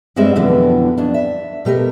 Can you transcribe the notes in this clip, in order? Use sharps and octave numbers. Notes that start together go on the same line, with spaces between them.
G2 G3 G#3 C4 G#4 E5
F2 B2 D3 E3 F#3 B3
F2 D4
E5
B2 A3 G4 A#4